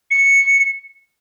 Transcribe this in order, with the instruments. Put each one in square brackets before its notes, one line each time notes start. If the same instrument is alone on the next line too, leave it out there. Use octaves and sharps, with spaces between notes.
[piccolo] C#7